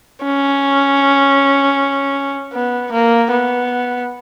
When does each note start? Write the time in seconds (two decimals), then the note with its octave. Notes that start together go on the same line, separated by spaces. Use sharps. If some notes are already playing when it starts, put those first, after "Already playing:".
0.25 C#4
2.53 B3
2.92 A#3
3.31 B3